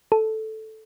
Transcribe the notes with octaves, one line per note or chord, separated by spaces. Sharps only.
A4